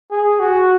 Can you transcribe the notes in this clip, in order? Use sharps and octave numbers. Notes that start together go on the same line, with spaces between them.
G#4
F#4